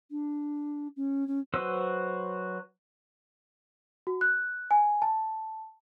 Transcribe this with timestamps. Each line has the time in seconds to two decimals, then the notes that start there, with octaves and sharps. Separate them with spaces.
0.10 D4
0.96 C#4
1.27 C#4
1.54 F#3 F#4 B4 C5 E6
4.07 F#4
4.21 F#6
4.71 G#5
5.02 A5